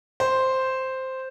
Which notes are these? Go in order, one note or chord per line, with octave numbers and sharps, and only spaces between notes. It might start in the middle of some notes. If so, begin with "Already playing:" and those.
C5